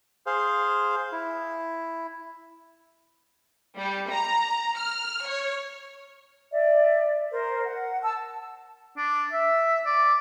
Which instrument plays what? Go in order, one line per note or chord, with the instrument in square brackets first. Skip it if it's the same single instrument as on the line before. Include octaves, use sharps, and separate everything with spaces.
[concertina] G#4 C5 F5
E4
[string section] G3
A#5
F6
C#5
[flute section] D5 E5
A#4 C5
F#5
A5 E6
[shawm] D4
E5
D5